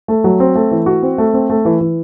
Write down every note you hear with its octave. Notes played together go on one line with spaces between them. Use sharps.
A3
F#3
C4
A3
E3
F#4
C4
A3
C4
A3
E3
E3